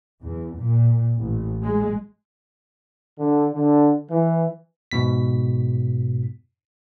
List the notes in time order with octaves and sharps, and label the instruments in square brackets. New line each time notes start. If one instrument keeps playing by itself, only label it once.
[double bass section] E2
A#2
A1
G#3
[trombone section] D3
D3
E3
[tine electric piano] G#2 B2 B6